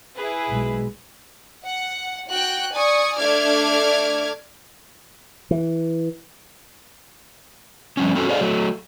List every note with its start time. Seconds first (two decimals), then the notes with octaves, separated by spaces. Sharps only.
0.15 E4 G#4 B4
0.49 B1 G#3
1.65 F#5
2.29 F#4 G5 F#6
2.72 D5 G#5 C#6 D#6
3.17 A3 D4 D6 F6 G#6
5.51 E3
7.97 F3 G3 C#4
8.15 C4 C#4 F#4 A4
8.29 G#4 A4 C5 D5 D#5 F5
8.40 F#3 A3